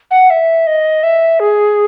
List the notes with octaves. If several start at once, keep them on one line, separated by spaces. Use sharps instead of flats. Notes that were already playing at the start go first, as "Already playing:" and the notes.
F#5
E5
D#5
E5
G#4